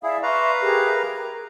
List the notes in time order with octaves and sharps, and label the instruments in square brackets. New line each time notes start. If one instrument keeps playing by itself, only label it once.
[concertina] E4 G#4 [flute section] D5 E5 F5
[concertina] B4 F5 A#5 [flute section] E5 C6 C#6
[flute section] G4 G#4 A#4
A#4